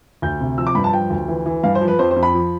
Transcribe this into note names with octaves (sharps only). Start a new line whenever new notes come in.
D2 G6
C3
F3 E6
D6
G2 B5
A5
F3 G5
D2
E3
E3
G2 F5
C5
F3
B4
F2 C5
C5
F2
B5
F3